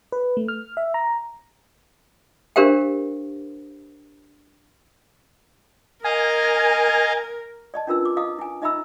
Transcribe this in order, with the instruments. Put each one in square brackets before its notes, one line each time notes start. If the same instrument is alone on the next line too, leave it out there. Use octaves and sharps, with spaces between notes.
[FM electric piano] B4
A3
F6
E5
A#5
[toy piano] D4 G4 A#4 C5 F5 G5
[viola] A#4 [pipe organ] D#5 F5 A#5 [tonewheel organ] G#5
[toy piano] D5 D#5 A5
C#4 D4 F4 A#4 B4 E6
D6
E4 D#5 F5 D#6
E4 G#5
D#4 D#5 E5 A#5 B5 E6